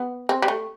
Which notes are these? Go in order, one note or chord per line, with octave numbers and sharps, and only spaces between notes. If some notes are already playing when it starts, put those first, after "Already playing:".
Already playing: B3
C4
G3
A3